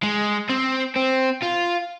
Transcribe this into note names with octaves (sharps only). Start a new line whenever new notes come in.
G#3
C4
C4
F4